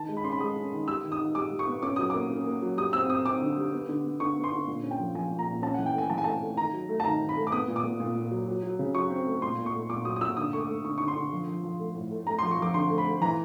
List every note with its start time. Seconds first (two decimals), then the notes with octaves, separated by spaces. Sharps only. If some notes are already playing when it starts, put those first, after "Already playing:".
Already playing: D#3 A5
0.09 G#3
0.17 B5
0.24 C#4 C6
0.32 B5
0.40 G#3 D#6
0.56 C#4
0.73 D#3
0.88 G3 E6
1.04 D#3
1.12 D#6
1.20 D#3
1.35 G3 D6
1.51 G3
1.59 C#6
1.67 B3
1.82 C#4 D6
1.96 F#3 D#6
2.10 A#3 D6
2.30 C#4
2.46 A#3
2.62 F#3
2.77 G3 D#6
2.93 C4 E6
3.09 C4 D#6
3.25 C4 D6
3.41 D3
3.57 G3
3.73 B3
3.89 D3
4.04 B3
4.20 D3 C#6
4.36 B3
4.44 C6
4.52 D3
4.68 A#2
4.83 C#4
4.91 G5
4.99 F3
5.15 F3 G#5
5.31 A#2
5.39 A#5
5.47 A#2
5.62 C#4 A5
5.74 E3 F#5
5.86 G5
5.94 A3 G#5
6.10 E3 A5
6.18 G#5
6.24 A3 A5
6.42 A3
6.57 D#3 A#5
6.73 F#3
6.89 A3
7.00 A5
7.05 D#3 A#5
7.21 D#3
7.29 B5
7.37 A3
7.47 D6
7.52 B3 D#6
7.68 A#2
7.76 D6
7.84 A#2
8.00 A#2
8.15 A#2
8.31 F#3
8.47 F#3
8.63 F#3
8.79 C#3
8.94 F#3 C#6
9.10 C4
9.26 A3
9.42 A#2 C6
9.58 A#2
9.66 C#6
9.74 A3
9.90 A#2 D6
10.05 F#3 D#6
10.16 D#6
10.21 A#2 E6
10.37 D3 D#6
10.53 A3 C#6
10.61 D6
10.69 A3
10.84 D3 C#6
10.98 D3 C#6
11.08 C6
11.16 D3
11.32 F3
11.48 F3
11.63 F3
11.79 A3
11.95 A2
12.11 A3
12.27 A3 A#5
12.38 F3 C6
12.51 C#6
12.58 F3 D6
12.74 D3 C6
12.90 A3
12.98 B5
13.06 A3
13.21 E3 A#5